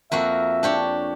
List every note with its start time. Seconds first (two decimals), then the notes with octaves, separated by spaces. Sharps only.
0.12 F2 A#3 F#4 E5
0.63 D4 G4 C#5